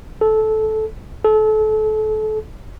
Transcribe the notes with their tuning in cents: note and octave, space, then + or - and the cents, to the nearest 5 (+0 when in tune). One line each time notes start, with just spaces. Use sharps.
A4 -15
A4 -30